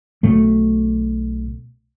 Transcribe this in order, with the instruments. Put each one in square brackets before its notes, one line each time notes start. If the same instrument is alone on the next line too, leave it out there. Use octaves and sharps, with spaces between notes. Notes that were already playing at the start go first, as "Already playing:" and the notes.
[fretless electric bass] B1 B2 A3